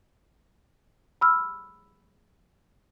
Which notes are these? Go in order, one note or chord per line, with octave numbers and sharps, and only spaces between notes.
B5 E6 F6